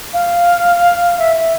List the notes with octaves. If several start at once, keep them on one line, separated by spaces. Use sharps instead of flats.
F5
E5
E5